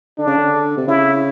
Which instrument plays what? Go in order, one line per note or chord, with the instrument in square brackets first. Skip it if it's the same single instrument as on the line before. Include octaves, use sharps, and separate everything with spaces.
[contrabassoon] D3 [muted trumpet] D4
[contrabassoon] C#3
D3
C3
[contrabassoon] C#3 [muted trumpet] E4